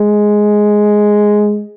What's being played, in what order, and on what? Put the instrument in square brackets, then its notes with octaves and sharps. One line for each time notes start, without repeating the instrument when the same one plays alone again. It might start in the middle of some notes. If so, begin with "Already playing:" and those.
Already playing: [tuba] G#3